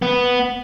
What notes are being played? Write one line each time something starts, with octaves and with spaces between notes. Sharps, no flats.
B3